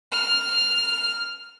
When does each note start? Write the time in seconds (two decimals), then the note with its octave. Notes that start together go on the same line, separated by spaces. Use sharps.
0.12 F6